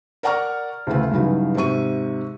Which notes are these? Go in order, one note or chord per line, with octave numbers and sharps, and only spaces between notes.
A#4 D5 F#5 A#5 C#6 F6
D2 C#3 E3 A3
G2 C#3 E3 F#3 D#4
G#2 C3 E5 C#6 D#7